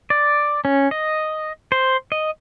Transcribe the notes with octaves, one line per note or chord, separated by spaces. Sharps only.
D5
C#4
D#5
C5
D#5